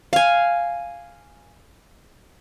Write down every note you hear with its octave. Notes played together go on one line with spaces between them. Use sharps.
F5 G#5